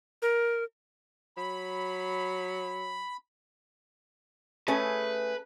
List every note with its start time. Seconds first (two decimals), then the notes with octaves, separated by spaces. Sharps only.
0.22 A#4
1.37 F#3 B5
4.68 A3 C#4 G#4 B4